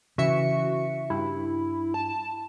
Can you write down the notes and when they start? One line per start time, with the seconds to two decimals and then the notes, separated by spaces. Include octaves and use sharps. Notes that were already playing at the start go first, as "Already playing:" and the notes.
0.18 C#3 E3 F#4 E5 C#7
1.10 G2 E4
1.94 A5